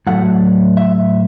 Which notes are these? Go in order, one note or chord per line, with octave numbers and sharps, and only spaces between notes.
A2 F#3 A3 F#5
E5